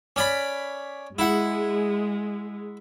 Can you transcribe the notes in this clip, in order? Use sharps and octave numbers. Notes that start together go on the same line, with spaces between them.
C#4 D5 B5
G#3 E4 F#5